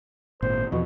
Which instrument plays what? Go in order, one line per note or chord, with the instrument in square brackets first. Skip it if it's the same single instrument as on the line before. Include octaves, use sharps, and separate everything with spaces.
[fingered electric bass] G#1 A#2 [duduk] C5
[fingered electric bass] E2 F3 [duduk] B2